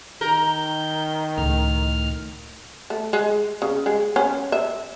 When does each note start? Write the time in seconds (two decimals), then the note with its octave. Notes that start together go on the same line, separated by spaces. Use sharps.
0.21 D#3 A#4 G6
1.38 C#2 A2 F6
2.90 A3
3.13 G#3
3.62 C#3
3.86 G#3
4.16 C#4
4.52 E5